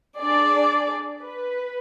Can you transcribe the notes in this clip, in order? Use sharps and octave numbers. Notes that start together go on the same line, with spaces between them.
D4 G#4 D5
B4